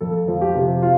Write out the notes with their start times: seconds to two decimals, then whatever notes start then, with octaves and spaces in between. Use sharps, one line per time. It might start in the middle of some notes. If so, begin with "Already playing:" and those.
0.01 F2 A4
0.28 F3
0.41 G4
0.55 C3
0.82 F4